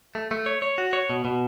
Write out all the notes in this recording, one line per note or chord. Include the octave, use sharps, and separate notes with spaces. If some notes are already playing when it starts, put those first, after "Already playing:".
A3
A3
C#5
C#5
F#4
C#5
B2
B2